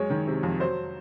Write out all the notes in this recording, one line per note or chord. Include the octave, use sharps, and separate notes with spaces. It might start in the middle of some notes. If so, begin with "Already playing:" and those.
Already playing: F#2 G#3 C#5
D#3
C3
F2
F#3 C5